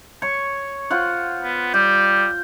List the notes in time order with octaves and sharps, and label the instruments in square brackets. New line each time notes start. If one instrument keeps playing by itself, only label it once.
[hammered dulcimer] C#5 C#6
F4 C5 F#5
[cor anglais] B3
[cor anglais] G3 [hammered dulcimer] G5